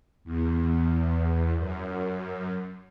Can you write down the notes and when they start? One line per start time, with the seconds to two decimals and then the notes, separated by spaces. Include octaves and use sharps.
0.24 E2
1.58 F#2